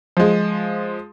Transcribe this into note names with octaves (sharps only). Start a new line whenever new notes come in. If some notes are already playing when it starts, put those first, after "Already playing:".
F3 G#3